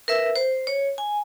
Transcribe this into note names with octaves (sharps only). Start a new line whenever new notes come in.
A#4 B4 E5 E6
C5
C#5
G#5